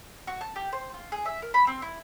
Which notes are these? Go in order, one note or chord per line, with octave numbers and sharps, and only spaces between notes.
F#4
A5
G4
C5
F4
G#4
E5
A#4
B5
C4
E4